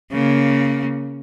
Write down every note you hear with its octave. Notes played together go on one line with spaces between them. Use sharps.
C#3 A#3